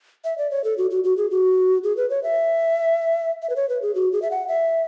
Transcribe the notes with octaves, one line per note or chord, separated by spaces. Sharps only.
E5
D5
C#5
A4
F#4
F#4
F#4
G#4
F#4
G#4
B4
C#5
E5
E5
B4
C#5
B4
G#4
F#4
G#4
E5
F#5
E5